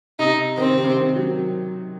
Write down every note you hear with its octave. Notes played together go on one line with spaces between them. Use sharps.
C3 D#4
D#3 C4
C3
C3
D#3
F#3